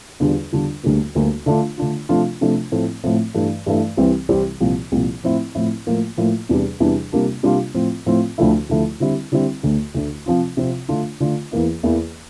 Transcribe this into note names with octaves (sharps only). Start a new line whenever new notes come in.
E2 D3 G3 D4 F4
E2 D3 G3 D4 F4
D2 D3 G3 A#3
D2 D3 G3 A#3
D3 A3 D4 F4
D3 A3 D4 F4
C3 F3 A3 D4 F4
C3 F3 A3 D4 F4
A2 F3 A3 C4
A2 F3 A3 C4
G2 E3 A3
G2 E3 A3
C2 C3 E3 G3 C4
C2 C3 E3 G3 C4
C2 A#2 F3
C2 A#2 F3
A2 F3 C4 E4
A2 F3 C4 E4
A2 F3 A#3 F4
A2 F3 A#3 F4
E2 C3 E3 G3 D4
E2 C3 E3 G3 D4
C3 G3 A#3 D4 F4
C3 G3 A#3 D4 F4
A2 F3 C4 F4
A2 F3 C4 F4
D2 D3 F3 A3 E4
D2 D3 F3 A3 E4
D3 G3 C4 E4
D3 G3 C4 E4
D2 D3 A3
D2 D3 A3
C3 F3 C4 F4
C3 F3 C4 F4
D3 A3 D4 F4
D3 A3 D4 F4
E2 E3 A#3 E4
E2 E3 A#3 E4